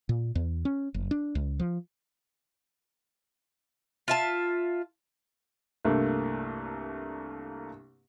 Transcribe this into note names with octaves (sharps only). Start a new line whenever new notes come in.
A#2
E2
C#4
F#1
D4
C#2
F3
F4 E5 A5
C2 G2 A3 A#3